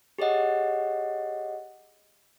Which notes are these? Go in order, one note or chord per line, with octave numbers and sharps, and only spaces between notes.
G4 G#4 C#5 D#5 F#5